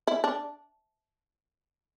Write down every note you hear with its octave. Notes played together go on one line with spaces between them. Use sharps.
E4
D4